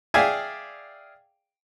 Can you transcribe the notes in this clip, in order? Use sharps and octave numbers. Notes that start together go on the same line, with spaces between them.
G#4 D5 E5 F5 G5 G#5